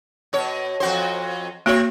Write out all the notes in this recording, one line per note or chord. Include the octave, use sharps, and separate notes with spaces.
B2 C#5
F2 F#4 C5
A#3 C4 F#4 C#5